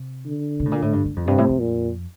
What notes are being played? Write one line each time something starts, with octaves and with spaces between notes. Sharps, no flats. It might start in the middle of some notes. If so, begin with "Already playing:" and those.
Already playing: C3
D3
C3
A2
A#2
A2
G2
G2
F2
G2 C3
A2
F2
A#2